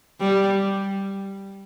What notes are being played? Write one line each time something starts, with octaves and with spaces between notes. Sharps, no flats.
G3